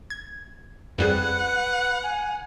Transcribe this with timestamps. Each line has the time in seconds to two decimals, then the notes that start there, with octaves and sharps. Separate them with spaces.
0.10 G#6
0.98 F2 G3 G#4 B4 F#5
2.04 G#5